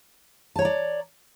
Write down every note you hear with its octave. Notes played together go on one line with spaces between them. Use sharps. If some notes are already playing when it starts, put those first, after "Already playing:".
C#5 D5 A5 A#5